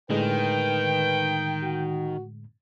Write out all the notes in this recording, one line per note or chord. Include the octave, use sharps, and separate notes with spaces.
A2 D3 D#3 G#3 B4 G5
F#4